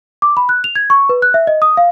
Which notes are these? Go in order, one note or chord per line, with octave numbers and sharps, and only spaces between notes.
D6
B5
F#6
F7
G#6
C#6
B4
F#6
E5
D#5
D#6
F5